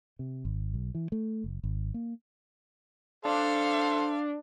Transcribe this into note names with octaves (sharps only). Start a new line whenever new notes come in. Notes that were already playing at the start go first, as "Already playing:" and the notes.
C3
G#1
B1
E3
A3
F#1
G#1
A#3
D4 A4 C5 F5